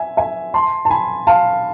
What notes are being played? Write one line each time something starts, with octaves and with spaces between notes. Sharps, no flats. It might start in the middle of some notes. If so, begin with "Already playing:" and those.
Already playing: E5 G#5
E5 G#5
A5 C6
A5
G#5 B5
F5 A5